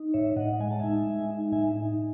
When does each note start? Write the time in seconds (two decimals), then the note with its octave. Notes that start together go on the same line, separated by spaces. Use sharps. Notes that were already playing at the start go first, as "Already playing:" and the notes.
Already playing: D#4
0.14 A2 C#5 E5
0.36 A2 D#5 F#5
0.60 G#3 G#5
0.70 A5
0.80 D#4 E5 G#5
1.07 G#3
1.29 D#4
1.52 A2 E5 G#5
1.75 D#4